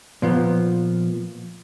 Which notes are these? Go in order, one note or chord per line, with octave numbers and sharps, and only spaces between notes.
A#2 F3 B3